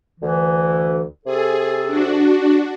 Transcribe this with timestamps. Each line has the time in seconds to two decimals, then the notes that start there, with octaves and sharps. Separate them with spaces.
0.20 D2 E3
1.25 C3 G#4 A4
1.87 D4 F#4